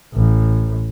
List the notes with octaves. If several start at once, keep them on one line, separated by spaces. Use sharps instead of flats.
A1